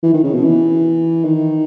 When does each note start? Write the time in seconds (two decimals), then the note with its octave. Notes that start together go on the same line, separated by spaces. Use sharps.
0.03 E3
0.14 D#3
0.24 C#3
0.34 B2
0.44 E3
1.25 D#3